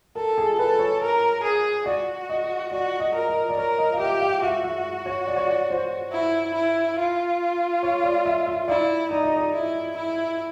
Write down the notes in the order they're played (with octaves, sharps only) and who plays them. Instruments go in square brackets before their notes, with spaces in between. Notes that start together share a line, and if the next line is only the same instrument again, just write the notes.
[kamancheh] A4 [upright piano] A#4
[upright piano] G#4
[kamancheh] A4 [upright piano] B4
[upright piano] C#5
[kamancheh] A#4
G#4
[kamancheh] F#4 [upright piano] D5
[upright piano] D#5
[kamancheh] F#4 [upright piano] D5
[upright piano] D#5
[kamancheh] A#4
[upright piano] D#5
D5
[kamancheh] A#4 [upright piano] C#5
[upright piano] D#5
F5
[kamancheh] G4 [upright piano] E5
[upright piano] F5
[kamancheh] F#4 [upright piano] E5
[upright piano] E5
C#5
D5
C#5
D5
C5
[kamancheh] E4
E4
F4
[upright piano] C#5
D5
E5
E5
[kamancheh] E4 [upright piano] D5
[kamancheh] D#4 [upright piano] D5
[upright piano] D#5
D5
[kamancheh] E4
E4